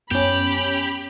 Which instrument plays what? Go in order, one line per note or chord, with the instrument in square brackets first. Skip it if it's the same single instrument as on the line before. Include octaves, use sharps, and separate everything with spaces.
[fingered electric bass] F#2 B3 [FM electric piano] C#4 G6 [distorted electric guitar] G4 [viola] B5